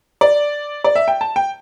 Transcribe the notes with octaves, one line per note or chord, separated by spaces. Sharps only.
D5
D5
E5
G5
A5
G5